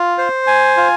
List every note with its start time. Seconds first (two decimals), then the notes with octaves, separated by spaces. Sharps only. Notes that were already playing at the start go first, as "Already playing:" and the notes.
Already playing: F4
0.18 C5
0.47 G#5
0.77 F4